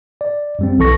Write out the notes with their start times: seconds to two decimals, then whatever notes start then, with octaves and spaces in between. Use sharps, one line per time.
0.21 D5
0.59 F#2 G3 C4
0.78 B1 E3 A4 C#6 A#6